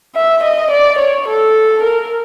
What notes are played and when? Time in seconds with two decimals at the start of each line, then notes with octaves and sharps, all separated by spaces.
0.15 E5
0.44 D#5
0.71 D5
0.99 C#5
1.28 A4
1.83 A#4